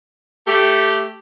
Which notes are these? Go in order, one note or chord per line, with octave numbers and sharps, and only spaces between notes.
A3 G4